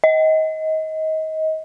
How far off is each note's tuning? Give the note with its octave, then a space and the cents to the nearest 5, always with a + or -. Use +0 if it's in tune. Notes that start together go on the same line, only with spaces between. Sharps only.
D#5 +25